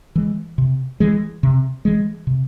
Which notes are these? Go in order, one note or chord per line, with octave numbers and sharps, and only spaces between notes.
E3 G#3
C3
E3 G#3
C3
E3 G#3
C3